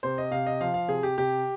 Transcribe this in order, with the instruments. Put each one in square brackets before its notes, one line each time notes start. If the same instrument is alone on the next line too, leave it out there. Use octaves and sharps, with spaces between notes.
[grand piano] C3 C5
D#5
C3 F5
D#5
F3 F5
F5
C3 G#4
G4
C3 G4